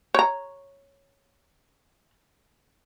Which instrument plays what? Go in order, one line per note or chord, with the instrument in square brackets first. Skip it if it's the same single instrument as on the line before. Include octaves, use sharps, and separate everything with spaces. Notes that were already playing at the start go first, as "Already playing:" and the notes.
[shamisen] C#5 A#5